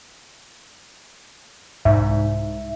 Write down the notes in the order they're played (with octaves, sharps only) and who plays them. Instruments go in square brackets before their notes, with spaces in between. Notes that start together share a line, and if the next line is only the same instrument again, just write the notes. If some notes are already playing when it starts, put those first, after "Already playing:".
[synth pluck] C2 G#2 [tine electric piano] E5